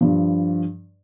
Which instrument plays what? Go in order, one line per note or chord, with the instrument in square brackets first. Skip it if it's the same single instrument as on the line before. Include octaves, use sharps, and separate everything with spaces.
[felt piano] G2 F3